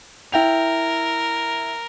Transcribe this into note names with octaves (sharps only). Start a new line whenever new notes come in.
E4 A#4 G5 F7